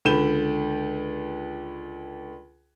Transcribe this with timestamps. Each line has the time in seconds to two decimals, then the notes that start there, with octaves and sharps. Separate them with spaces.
0.05 C#2 D3 B5 G6 E7 G7